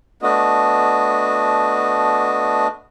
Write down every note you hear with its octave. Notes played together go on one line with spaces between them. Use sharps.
A3 B3 D4 F#4 D#5